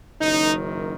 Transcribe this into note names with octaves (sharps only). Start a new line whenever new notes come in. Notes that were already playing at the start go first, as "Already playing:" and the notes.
F#1 F#2 D#3 D#4